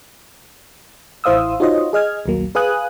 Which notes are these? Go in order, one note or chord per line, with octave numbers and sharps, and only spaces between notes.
A1 E4 C5 F5 D#6 E6
D#4 F4 F#4 C5 C#5 D#5
G#4 D#5 F6 G#6
A#1 D#2 F#3 A#3
G#4 B4 F5 G#5 D#6 F#6